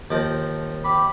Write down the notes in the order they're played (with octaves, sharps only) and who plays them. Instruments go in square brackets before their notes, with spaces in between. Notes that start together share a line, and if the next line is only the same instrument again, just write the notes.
[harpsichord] D#2 F3 A#4
[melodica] G4 B5